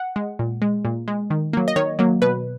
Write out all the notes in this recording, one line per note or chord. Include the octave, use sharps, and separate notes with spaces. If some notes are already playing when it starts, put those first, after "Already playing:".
Already playing: F#5
G#3
A#2
G#3
A#2
G#3
D#3
F#3 A#3
D#5
D#3 C#5
F#3 A#3
B2 B4